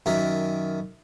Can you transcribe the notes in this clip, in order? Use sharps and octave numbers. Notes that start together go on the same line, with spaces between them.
F#2 D#3 A#4 E5